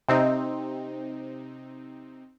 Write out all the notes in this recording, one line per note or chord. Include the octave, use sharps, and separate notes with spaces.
C3 C4 D#4